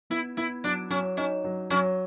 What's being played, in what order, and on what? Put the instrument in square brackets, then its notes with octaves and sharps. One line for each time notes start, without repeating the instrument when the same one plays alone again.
[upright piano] B3 [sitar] E4
[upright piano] B3 [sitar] E4
[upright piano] F#3 [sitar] D4
[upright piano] F#3 [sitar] C#4
[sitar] C#4 [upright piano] D#4
[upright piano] F#3
[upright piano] F#3 [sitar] C#4